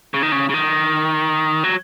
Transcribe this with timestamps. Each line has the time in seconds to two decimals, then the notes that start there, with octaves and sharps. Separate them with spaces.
0.14 C#3
0.23 D#3
0.32 C#3
0.49 C#3
0.54 D#3
1.64 F#3